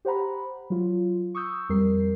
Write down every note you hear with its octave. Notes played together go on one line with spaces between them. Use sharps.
G4 C5 F#5 A#5 B5
F#3 F4
C#6 D#6 E6 G6
F2 G3 A#4 C7